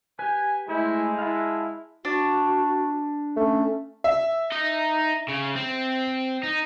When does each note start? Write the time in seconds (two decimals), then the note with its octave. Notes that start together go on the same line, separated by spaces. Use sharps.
0.19 G4 B4 G#5
0.69 G#3 A3 E4 C5 G#5
1.19 E4 F5 F#5 A5
2.05 D4 F#4
3.37 A3 C#4
4.04 E5
4.52 D#4 D#5
5.29 C#3
5.55 C4
6.43 D#4